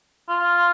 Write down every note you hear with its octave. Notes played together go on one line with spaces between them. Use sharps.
F4